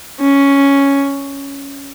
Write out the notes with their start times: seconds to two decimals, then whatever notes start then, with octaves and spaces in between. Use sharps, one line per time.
0.20 C#4